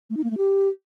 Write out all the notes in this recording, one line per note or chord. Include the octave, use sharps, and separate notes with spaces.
A3
D#4
A#3
A3
G4